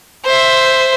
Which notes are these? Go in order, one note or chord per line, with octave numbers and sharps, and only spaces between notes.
C5 E5